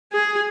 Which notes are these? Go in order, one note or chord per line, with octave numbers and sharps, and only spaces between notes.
G#4